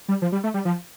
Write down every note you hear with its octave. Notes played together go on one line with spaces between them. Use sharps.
G3
F3
G3
A3
G3
F3